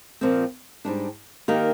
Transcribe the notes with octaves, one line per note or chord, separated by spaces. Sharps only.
A#2 F3 C4
G#2 G3 D4
D#3 A#3 D#4 G4 A#4